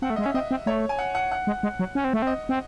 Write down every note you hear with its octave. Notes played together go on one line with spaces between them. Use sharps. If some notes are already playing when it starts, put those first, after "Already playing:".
C4 F#5
A3 E5
G#3 D#5
C#4 E5
C4 D#5
C4
A3 C#5
G#5
F#5
F#5
F#5
G#3
G#3
F#3
C#4
C4
A3
C4 D#5
C4